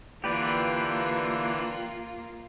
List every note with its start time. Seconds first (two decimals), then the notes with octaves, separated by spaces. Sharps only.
0.24 D3 E3 A#3 F4 G4 B4 D5 F#6